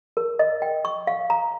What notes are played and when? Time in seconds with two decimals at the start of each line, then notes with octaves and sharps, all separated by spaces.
0.17 A#4
0.39 D#5
0.62 G5
0.85 C#6
1.07 F5
1.30 A#5